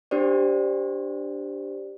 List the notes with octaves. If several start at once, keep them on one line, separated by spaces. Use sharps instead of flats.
D4 G4 C5 D5